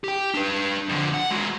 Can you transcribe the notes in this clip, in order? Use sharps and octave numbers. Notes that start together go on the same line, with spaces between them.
G4 G5
D4 B4
F2 D3
F#5
G#3 F#4